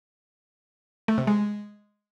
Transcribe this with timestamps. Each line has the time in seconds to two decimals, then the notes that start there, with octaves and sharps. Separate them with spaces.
1.08 A3
1.18 C3
1.27 G#3